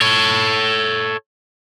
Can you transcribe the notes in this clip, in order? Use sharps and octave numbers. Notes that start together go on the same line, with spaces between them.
A4 C#5